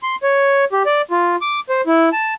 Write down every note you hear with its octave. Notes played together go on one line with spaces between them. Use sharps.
C6
C#5
G4
D5
F4
D6
C5
E4
A5